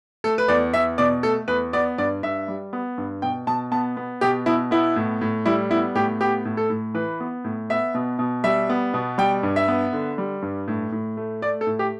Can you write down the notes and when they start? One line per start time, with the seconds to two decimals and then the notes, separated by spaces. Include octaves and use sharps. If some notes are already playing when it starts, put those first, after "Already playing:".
0.24 A3 A4
0.38 B4
0.48 E2 D5
0.74 E2 E5
0.98 B2 D5
1.23 A3 A4
1.48 E2 B4
1.73 B3 D5
1.98 G2 D5
2.23 G2 E5
2.48 G3
2.73 B3
2.98 G2
3.22 B2 G5
3.47 B2 A5
3.72 B3 A5
3.97 B3
4.21 B2 G4
4.46 B2 E4
4.71 B3 E4
4.96 A2
5.21 A2
5.46 G3 E4
5.71 B3 E4
5.95 A2 G4
6.21 B3 G4
6.45 A2
6.57 A4
6.70 A2
6.94 E3 B4
7.20 B3
7.44 A2
7.70 B3 E5
7.95 B2
8.19 B2
8.44 G3 E5
8.69 B3
8.94 B2
9.18 G3 G5
9.43 G2
9.56 E5
9.68 B3
9.93 D3
10.18 G3
10.42 G2
10.68 A2
10.92 A2
11.17 A3
11.42 A3 D5
11.61 A4
11.67 A2
11.79 G4